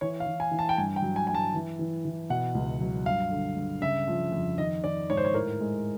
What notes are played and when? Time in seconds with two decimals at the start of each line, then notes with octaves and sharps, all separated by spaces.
0.01 E3 C#5
0.20 F5
0.26 E3
0.40 G#5
0.51 E3
0.59 A5
0.69 G5
0.78 G2 G#5
0.96 G5
1.02 F#3
1.16 G#5
1.27 G2 G#5
1.35 A5
1.54 E3
1.79 E3
2.05 E3
2.30 B2 F#5
2.55 C#2
2.80 F#3
3.06 G2 F5
3.31 D3
3.57 G2
3.82 C#3 E5
4.08 F3
4.32 F2
4.58 D#3 D#5
4.84 D#3 D5
5.10 G#2 C#5
5.17 C5
5.25 C#5
5.34 A2 A#4
5.61 G#3